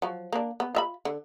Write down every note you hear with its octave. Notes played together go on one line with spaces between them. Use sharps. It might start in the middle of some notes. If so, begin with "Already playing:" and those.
F3 F#3
A#3 D4
B3
F4 E5 B5
D3